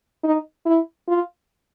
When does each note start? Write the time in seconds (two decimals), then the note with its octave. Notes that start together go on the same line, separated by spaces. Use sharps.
0.24 D#4
0.66 E4
1.08 F4